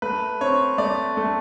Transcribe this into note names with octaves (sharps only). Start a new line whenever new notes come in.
A3 B4
C4 C#5
A3 D5
A3